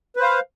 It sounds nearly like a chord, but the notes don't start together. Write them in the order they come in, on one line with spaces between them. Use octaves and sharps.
B4 C5 F5